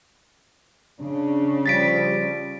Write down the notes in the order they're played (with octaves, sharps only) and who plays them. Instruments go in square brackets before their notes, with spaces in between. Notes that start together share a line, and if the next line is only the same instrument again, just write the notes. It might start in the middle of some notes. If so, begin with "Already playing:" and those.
[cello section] C#3 [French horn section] D4
[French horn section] F3 G3 [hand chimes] A6 B6 D7